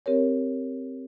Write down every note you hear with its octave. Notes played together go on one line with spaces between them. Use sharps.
C4 G4 A#4 C#5